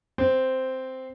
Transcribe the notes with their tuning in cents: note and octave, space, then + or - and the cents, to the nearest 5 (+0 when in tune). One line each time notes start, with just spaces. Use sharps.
C4 -5